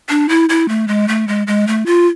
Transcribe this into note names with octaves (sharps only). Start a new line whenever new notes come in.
D4
E4
E4
A3
G#3
A3
G#3
G#3
A3
F4